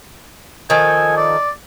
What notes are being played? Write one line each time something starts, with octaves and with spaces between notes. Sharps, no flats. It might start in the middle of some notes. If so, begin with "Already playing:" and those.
D#3 F3 A4 G#5
D5